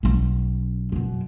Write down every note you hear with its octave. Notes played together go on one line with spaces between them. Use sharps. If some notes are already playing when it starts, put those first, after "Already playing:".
B1 C#4
F#2 B2